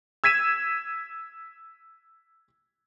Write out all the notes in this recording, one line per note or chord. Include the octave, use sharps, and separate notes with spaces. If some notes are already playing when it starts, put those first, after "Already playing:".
E6 G#6 B6 D#7 E7